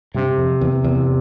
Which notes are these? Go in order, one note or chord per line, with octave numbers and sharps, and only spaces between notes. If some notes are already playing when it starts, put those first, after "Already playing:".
G2 C3
F2
E2
E2